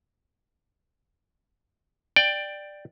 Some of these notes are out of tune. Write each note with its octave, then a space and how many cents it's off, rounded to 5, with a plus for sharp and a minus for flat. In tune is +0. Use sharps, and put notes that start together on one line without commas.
D5 +10 G5 +5